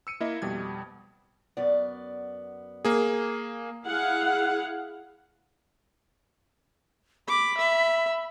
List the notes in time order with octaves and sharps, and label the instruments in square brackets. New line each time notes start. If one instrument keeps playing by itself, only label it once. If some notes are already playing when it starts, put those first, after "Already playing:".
[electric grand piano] E6 C#7 D#7
A#3 E4 D#5 E5
F2 B2 G3 G#6
[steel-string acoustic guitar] F#2 B3 D5
[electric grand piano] A#3 G#4
[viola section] E4 G#4 F5 F#5
[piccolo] B5 [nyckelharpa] D6
[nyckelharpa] E5